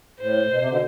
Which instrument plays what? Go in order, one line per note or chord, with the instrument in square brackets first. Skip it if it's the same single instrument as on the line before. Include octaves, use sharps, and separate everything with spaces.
[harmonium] A2 [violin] C5
[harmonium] A2
B2
C3
B2 D3